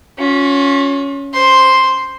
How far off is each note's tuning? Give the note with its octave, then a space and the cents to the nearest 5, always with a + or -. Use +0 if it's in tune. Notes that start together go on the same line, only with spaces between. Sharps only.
C#4 +10 F4 +40
C5 +0 C6 +0